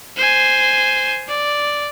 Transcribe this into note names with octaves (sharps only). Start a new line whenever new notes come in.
C5 G#5
D5